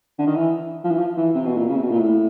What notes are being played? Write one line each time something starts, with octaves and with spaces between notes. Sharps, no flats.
D3
D#3
E3
F3
E3
F3
E3
C3
B2
A#2
C#3
C3
B2
A#2
A2